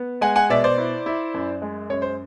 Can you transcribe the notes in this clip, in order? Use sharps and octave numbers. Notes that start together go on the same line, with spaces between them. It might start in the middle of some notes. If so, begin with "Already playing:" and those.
Already playing: B3
G#3 F#5 G#5
F#5 G#5
B2 D5 E5
C5 D5
E4
E4
F#2
G#3
F#2 C#5
C5